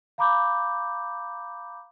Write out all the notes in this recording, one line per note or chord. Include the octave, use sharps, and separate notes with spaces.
F5 A#5 B5 D6 G6